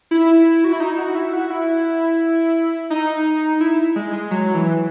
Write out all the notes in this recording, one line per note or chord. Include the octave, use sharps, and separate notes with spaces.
E4
F#4
E4
D#4
F#4
E4
F#4
E4
D#4
E4
G#3
G#3
F#3
E3